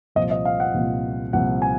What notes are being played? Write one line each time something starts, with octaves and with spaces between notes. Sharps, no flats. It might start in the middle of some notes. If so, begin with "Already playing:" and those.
C2 A#2 F3 D#5
D#5
F5
F#5
C2 A#2 F3
C2 A#2 F3 F#5
G#5